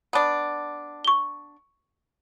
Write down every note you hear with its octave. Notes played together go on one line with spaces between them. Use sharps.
B3 D4
C#6 G7